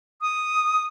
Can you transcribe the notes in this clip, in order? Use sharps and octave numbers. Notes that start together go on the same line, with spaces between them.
D#6